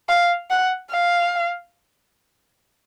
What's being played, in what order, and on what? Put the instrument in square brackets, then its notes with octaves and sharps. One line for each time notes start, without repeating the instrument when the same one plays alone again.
[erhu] F5
F#5
F5